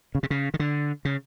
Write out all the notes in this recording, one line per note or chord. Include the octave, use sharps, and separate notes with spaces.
C#3
C3
C#3
D#3
D3
C#3